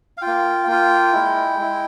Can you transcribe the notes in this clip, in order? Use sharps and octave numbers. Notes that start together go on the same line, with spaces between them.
F5
A#3 F4 G5
A#3 F4
G#3 E4
G#3 E4